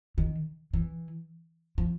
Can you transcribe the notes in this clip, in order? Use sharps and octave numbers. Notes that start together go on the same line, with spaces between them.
D#3
E3
F3